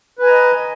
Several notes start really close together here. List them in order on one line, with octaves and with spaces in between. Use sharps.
B4 G#5 A#5 D#5